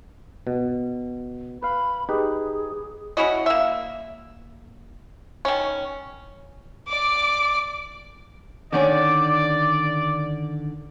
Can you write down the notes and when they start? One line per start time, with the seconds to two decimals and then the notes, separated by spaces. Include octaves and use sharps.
0.47 B2
1.63 B4 F5 B5
2.09 D#4 G4 G#4 B4
3.17 C#4 E4 F#4 D#5
3.46 A#3 E5
5.45 D#3 C#4
6.87 D5 D6
8.73 D3 D#3 C#4 D5